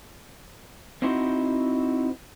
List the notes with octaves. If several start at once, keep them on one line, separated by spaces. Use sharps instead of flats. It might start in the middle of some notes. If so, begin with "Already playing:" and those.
C4 D#4 E4 F#4 C5